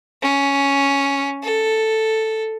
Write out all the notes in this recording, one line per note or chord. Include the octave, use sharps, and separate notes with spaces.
C#4
A4